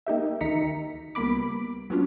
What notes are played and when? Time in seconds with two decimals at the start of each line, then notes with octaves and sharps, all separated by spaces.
0.07 A#3 D#4 G4 E5
0.41 D2 D#3 D#4 A#5 B6 C#7
1.15 C#2 G3 A#3 B3 B5 D6
1.90 F#3 B3 C#4 D4 F4